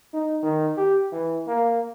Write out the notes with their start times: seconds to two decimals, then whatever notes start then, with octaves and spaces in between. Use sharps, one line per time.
0.13 D#4
0.43 D#3
0.77 G4
1.12 E3
1.47 A#3